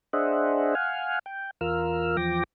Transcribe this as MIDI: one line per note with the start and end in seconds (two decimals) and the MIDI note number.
0.13 0.75 62
0.13 0.75 68
0.13 0.75 72
0.13 0.75 75
0.13 0.75 76
0.13 0.75 78
0.75 1.19 77
0.75 1.19 78
0.75 1.19 80
0.75 1.19 89
1.26 1.51 79
1.61 2.17 40
1.61 2.17 65
1.61 2.17 70
1.61 2.17 88
1.61 2.17 89
2.17 2.43 40
2.17 2.43 53
2.17 2.43 79
2.17 2.43 86
2.17 2.43 94